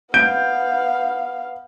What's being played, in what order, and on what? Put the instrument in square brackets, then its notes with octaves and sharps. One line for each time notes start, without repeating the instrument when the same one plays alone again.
[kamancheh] B3 F5 [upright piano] G6 D7